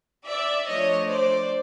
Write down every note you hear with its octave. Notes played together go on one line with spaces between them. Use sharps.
D5 E5
F3 A3 D4 C#5 D#5
C5 D5